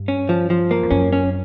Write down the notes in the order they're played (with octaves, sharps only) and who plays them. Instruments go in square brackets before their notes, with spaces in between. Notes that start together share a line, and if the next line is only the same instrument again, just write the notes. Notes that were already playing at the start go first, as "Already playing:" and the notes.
Already playing: [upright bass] G2
[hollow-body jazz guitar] C#4
F3
F3
A#3
[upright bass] F2
[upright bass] F#2 [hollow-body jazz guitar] C#4
[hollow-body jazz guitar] C#4